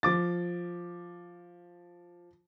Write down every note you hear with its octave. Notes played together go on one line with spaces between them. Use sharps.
F3 D6 A6